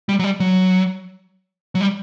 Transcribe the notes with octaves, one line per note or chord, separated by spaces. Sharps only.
G3
F#3
G3
F#3
F#3
G3